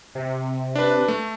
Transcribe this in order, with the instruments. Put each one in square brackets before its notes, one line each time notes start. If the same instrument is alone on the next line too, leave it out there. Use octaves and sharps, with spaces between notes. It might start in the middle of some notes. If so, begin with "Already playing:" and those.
[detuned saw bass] C3
[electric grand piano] D4 B4
A3